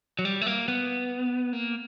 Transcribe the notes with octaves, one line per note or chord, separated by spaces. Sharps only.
F#3
G3
A3
A#3
B3
A#3